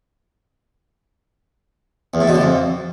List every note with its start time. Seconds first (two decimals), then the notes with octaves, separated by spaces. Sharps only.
2.14 E2
2.21 A2
2.28 B2
2.34 D3
2.41 F2